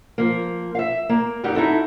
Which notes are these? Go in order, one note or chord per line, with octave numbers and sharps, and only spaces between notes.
F3 A#3
E5 F5
A#3
G2 G3 D#4 F#4 G4
D#4 E4 F#4 A4